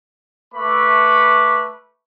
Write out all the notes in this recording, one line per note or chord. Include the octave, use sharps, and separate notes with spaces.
A3 B4 B5 C#6 D6